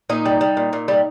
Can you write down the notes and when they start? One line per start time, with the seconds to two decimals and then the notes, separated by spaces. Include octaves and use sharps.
0.10 A#2 D#4
0.25 G3
0.41 G3
0.57 A#2
0.73 A#2
0.88 G3